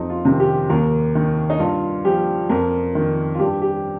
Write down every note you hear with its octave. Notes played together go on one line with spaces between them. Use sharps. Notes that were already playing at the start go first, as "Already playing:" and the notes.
Already playing: F2 D#4
F4
C3 D#3
G4
D#2 A#4
D#3
D#4
G2 F4
F3 G4
F2 A#4
D#3
F4
G2 G4
G4